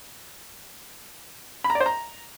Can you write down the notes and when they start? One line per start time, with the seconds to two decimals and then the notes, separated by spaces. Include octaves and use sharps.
1.64 B5
1.70 A#5
1.75 D5
1.80 C5
1.86 A#5